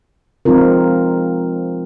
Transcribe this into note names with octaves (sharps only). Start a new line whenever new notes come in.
F3 G#3 C4 D#4 F4 A#4